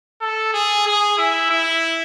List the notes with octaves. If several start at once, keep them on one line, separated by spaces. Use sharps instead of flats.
A4
G#4
G#4
E4
E4